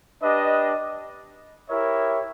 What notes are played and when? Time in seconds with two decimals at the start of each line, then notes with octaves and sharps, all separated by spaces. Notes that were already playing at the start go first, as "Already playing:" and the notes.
0.22 D4 G4 B4 D#5
1.68 E4 G4 A#4 C#5 E5